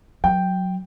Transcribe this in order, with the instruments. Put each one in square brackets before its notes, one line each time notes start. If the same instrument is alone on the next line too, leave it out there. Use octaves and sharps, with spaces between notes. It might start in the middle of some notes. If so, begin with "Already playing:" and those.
[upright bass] F#3 [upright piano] G5